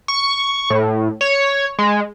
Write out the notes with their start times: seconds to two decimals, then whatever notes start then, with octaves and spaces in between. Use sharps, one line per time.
0.08 C#6
0.70 A2
1.21 C#5
1.79 G#3